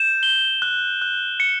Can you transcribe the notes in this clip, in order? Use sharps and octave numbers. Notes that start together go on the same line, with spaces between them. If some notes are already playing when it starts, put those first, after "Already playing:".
Already playing: G6 E7
G7
F#6
F#6
C#7